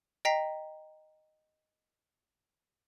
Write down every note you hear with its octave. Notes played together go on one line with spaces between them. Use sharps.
D#5 G5 A#5 B6 C7